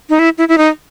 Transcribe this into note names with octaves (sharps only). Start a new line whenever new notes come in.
D#4
E4
E4
E4
D#4